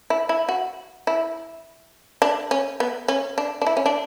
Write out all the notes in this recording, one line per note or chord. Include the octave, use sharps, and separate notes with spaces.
E4
E4
F#4
E4
D4
C#4
B3
C#4
D4
D4
E4
C#4
D4